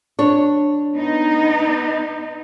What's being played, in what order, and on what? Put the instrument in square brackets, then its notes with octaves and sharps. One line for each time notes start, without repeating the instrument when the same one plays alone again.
[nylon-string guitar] D4 C#5
[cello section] B3 D#4